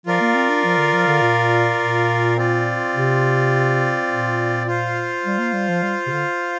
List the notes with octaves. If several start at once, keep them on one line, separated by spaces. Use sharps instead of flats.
F3 F4 A#4 D5 F5
A#3
C4
D4
F3
D3
F3
D3
A#2
A#2
C4 F4 D5
C3
A#2
F4 C5 F5
G3
A#3
G3
F3
G3
C3
D3